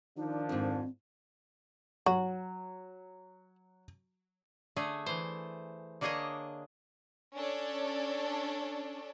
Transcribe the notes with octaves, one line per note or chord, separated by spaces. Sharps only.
D#3 F3 D4 D#4
F2 G#2 C4
F#3 F#4
D3 A3 G#4
E3 C5
D3 A#3 D4 G#4 C#5 D#5
C#4 D4 A4 C#5 D5